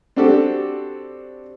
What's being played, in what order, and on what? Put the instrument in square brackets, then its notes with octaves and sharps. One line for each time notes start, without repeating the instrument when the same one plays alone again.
[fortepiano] C4 D4 F#4 G4 A4